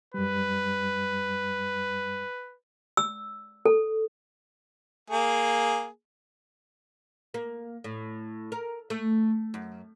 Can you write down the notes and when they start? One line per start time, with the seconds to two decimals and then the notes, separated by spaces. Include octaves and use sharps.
0.14 F#2 G3 B4
2.97 E6
3.65 A4
5.10 A#3 G#4
7.34 A#3
7.84 A2
8.52 A#4
8.90 A3
9.54 F#2